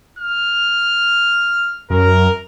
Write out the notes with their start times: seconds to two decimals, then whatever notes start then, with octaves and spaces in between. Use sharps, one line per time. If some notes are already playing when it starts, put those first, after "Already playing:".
0.19 F6
1.90 F#2 A#4